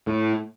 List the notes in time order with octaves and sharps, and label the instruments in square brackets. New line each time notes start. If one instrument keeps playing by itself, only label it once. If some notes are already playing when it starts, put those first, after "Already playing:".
[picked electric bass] A2